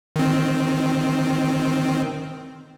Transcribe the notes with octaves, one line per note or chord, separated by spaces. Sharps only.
D#3 C4